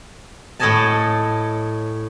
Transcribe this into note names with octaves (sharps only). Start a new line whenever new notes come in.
A2 A4 C#5 D#5 G#5 A5